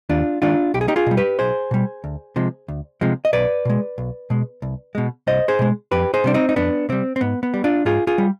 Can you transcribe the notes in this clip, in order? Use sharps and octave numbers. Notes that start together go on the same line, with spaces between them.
D#2 D4 F4
D#3 G#3 D4 F4
B1 G4
G#4
D#4 G4
F4 G#4
B2 G3
G4 B4
B1 G#4 C5
B2 G3
D2
C3 F3 G#3
D2
C3 F3 G#3
D#5
B1 B4 D5
B2 G#3
B1
B2 G#3
C2
B2 G#3
C2 C5 D#5
G#4 C5
B2 G#3
F2 G4 B4
G#4 C5
C3 G3 D4
C4 D#4
D#4
F2 B3 D4
C3 G3 C4
C4
G#2 B3
B3
G3
D4 F4
G#2 F4 G#4
F4 G#4
G3